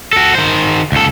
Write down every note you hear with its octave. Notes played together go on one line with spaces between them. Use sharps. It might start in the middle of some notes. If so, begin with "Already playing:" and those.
F#4 A4
D#3 C5
C#2 A4